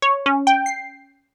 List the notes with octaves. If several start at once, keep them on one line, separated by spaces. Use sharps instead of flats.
C#5
C#4
G5
C7